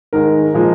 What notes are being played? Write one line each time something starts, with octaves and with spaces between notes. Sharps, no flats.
G#2 D#3 G#3 A#4
A#2 F3 G#3